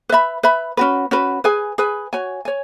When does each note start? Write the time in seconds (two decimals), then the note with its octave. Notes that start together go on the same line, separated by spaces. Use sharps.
0.09 B4 E5 B5
0.43 B4 E5 B5
0.77 C#4 F#4 B4
1.11 C#4 F#4 B4
1.44 G#4 B4 G#5
1.78 G#4 B4 G#5
2.13 F#4 C#5 G#5
2.45 C#5 G#5